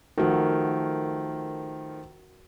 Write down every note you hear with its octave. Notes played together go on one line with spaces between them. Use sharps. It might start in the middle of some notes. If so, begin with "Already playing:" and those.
D#3 F3 A3 F#4 A#4